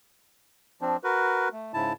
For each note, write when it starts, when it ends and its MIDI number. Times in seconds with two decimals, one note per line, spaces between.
0.81 0.97 53
0.81 0.97 60
0.81 0.97 62
1.04 1.49 66
1.04 1.49 70
1.04 1.49 71
1.52 1.72 57
1.74 1.93 44
1.74 1.93 49
1.74 1.93 64
1.74 1.93 81